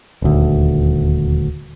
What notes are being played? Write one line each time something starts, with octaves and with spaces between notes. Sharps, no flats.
D#1 D2